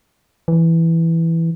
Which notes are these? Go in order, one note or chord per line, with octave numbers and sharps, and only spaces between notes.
E3